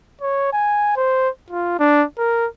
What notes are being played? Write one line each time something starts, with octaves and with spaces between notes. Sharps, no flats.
C#5
G#5
C5
F4
D4
A#4